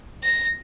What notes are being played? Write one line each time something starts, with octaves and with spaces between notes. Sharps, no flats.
A#6